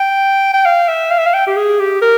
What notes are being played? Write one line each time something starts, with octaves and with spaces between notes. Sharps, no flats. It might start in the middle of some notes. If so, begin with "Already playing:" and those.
Already playing: G5
G5
F5
E5
F5
E5
F5
G5
G4
G#4
G4
A#4